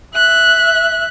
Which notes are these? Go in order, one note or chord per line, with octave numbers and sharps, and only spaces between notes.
E5 F#6